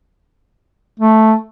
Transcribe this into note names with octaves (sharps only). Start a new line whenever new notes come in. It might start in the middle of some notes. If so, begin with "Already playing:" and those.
A3